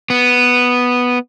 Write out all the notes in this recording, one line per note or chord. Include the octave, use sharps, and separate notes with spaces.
B3